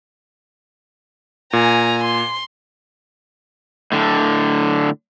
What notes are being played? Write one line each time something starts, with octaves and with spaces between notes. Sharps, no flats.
A#2 G#5 A#5
C6
A2 D3